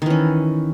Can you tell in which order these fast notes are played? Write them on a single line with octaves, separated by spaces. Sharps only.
D#3 E3 C#4